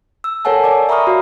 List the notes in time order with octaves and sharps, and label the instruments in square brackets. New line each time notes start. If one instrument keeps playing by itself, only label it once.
[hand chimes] E6
A4 A#4 C#5 F#5 G#5 A5
D5 D6
E5 A#5 B5 C#6 D#6 F6
F#4 F5